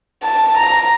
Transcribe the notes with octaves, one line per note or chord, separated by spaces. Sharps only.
A5
A#5